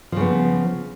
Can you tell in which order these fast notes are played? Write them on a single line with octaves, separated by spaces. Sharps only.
F3 C#3 B3